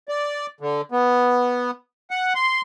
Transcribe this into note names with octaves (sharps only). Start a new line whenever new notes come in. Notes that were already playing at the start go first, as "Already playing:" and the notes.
D5
D3
B3
F#5
C6